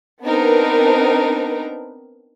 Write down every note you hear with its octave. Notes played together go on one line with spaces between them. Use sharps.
B3 C4 D4 D#4 A#4 B4